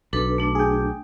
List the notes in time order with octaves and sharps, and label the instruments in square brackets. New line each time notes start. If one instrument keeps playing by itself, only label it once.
[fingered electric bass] B1 [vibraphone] D4 A4 B4
[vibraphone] A3 D4
[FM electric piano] G#4 G5